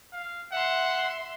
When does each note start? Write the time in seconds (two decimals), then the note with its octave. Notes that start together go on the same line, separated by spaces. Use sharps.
0.13 F5
0.52 E5 F#5 C6